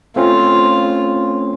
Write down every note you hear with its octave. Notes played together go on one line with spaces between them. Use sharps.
A3 C4 C#4 F4